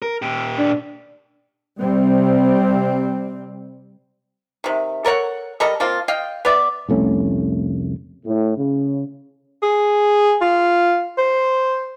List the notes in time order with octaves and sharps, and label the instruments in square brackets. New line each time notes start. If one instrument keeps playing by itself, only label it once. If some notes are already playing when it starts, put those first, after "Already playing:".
[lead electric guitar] A#4
A#2 G4
[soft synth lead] D4
[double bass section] C3 G3 C4
[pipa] C3 D#3
A4 A#4 C#5 F#5
G3 A4 A#4 D#5
F3 A#3 C4 F4
D#5 F5 G5
B3 D5 E5
[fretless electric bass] F1 C2 A3 C#4
[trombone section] A2
C#3
[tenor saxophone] G#4
F4
C5